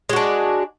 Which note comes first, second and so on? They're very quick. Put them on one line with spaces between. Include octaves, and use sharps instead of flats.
G#3 F#4 D4